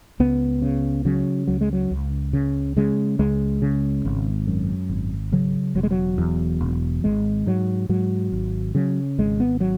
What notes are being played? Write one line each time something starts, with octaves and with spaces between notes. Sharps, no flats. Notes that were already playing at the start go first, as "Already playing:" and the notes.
C#2 B3
C#3
C#3 F#3
C#2 F#3
G#3
F#3
C#2
C#3
C#3 G#3
C#2 G#3
C#3
G#1
F#2
G#1
C#3 F#3
E1 F#3
G#3
F#3
E2
E1
G#1 G#3
G#2 F#3
G#2 F#3
G#1
C#3 F#3
G#1 G#3
B3
F#3